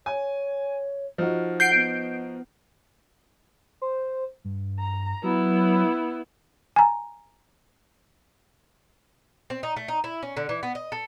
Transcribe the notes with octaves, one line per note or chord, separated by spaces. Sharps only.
C#5 G#5
F3 D#4 F#4
F#5 G6 C7 D7
B3
C5
G2
A#5
F#3 B3 E4
G#5 A#5
C4
D#4
A3
D#4
E4
C#4
D3
E3
B3
D#5
A4